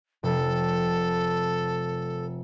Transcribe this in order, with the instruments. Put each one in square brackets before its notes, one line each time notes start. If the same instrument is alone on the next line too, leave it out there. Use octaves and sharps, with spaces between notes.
[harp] F1 [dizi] A4